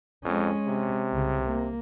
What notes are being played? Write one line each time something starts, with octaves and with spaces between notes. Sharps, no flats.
F2 G#3 C#4
C3
C2 C#3
A#3